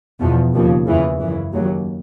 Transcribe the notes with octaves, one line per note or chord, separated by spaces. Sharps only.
E2 B2 F3
D#2 C#3 F3
E2 C#3 E3
F#2 C#3 E3
D#2 C#3 F#3